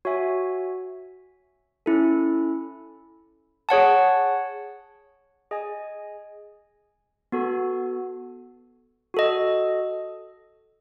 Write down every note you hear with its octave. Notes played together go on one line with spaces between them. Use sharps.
F#4 C#5 E5 G#5
C#4 E4 A4
G#4 C#5 F#5 A5
G#4 D#5 G#5
B3 F#4 A4
F#4 A4 D#5